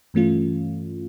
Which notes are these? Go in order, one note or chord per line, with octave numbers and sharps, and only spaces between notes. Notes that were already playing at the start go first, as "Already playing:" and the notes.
G2 E3 A3 C#4 F4